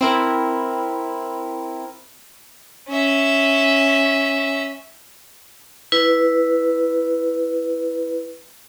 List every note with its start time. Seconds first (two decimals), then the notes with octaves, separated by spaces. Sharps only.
0.01 C4 E4 A#4
2.89 C#4 E5
5.92 E4 B4